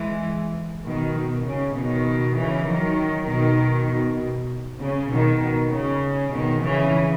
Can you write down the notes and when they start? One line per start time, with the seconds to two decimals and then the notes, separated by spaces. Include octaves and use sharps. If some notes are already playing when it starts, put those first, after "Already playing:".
Already playing: E3 G#3
0.86 B2 D#3
1.17 B2
1.46 C#3
1.77 B2 D#3
2.38 C#3 E3
2.69 D#3 F#3
3.29 B2 D#3
3.90 B2
4.81 C#3
5.12 B2 D#3
5.43 B2
5.73 C#3
6.34 B2 D#3
6.65 C#3 E3